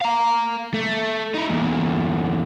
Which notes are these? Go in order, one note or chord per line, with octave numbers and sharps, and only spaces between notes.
F5 A#5
A3
D#4 E4
E2 A#2